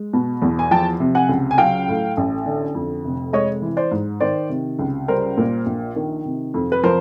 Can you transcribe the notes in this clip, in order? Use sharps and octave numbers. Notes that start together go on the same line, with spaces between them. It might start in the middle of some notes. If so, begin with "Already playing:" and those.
Already playing: G#3
B2
E2
G#5
F3 G5 A5
C3
F#5 G#5
C#2
G#5
F#3 F5 G5
A2
A1
D3
F2
F1
G#3 C#5 D#5
E3
C5 D5
G#2
D#3 C5 D5
C3
C#2
G3 A#4 C5
A#2
A#1
D#3
C3
F2
B4
F3 A#4 C5